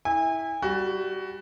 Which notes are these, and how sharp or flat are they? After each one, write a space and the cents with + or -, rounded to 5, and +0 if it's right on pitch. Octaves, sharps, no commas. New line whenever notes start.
E4 -15 G#5 -35
G3 +0 F#4 +20